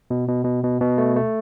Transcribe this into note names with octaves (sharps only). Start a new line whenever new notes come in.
B2
B2
B2
B2
B2
A3
A3